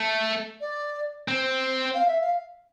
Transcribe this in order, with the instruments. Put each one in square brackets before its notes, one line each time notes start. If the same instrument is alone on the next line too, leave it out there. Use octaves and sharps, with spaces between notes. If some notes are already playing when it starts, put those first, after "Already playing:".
Already playing: [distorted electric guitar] A3
[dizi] D5
[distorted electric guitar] C4
[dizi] F5
E5
F5